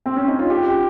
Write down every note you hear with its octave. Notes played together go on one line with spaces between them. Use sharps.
C4
C#4
D#4
F4
G4